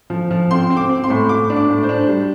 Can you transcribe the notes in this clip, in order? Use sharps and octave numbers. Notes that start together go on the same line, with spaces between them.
F3
F3
C4 C6
C4
D6
C4
C6
A2
A2 D6
D4
D6
A2
C5
D4
G3